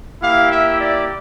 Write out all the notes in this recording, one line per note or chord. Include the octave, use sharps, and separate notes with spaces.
A#3 E4 G4 F5
E5
D5